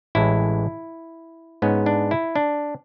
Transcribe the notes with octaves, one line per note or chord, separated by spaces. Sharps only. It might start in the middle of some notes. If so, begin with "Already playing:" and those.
A1 A2 G#3 E4
G#2 G#3 B3 C#4
D4
E4
D4